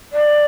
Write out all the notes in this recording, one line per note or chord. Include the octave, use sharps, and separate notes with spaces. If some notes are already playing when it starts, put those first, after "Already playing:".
D5